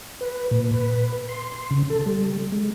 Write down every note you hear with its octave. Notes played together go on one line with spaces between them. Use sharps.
B4
A#2
B4
C6
C#3
A4
G3
G#3